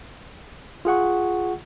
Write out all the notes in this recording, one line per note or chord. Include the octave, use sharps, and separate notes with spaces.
F4 G#4 F#5 C#6